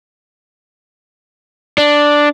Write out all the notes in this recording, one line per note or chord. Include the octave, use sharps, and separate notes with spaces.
D4